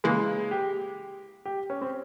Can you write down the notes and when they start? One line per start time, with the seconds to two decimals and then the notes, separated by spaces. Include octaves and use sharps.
0.04 C#3 E3 G#3 A#3 E4
0.51 G4
1.45 G4
1.70 C#4
1.81 C4